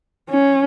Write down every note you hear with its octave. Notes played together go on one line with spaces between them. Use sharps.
C#4